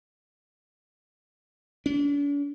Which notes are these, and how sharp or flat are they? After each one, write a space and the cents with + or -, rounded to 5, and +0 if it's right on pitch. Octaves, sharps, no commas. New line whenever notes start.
D4 -45